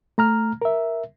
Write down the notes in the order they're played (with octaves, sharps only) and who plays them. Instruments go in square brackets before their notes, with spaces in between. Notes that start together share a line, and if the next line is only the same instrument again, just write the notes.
[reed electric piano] A3 A#5 F6
A#4 E5